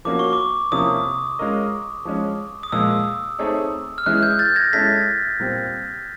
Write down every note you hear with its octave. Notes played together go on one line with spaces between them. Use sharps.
F3 A#3 C#4 F#4 D6
C#6
D6
C3 F3 A#3 C#4 E4 D#6
G#3 C#4 F4 A#4 D#5
F3 G#3 C#4
D#6
A#2 F3 G#3 E6
A3 C4 D#4 G#4 C#5
F6
E3 G#3 C#4 E4 G#4 F#6
G6
G6 A6
G#6 A#6
G#3 C#4 E4 A4 A6 B6
A#2 G3 C4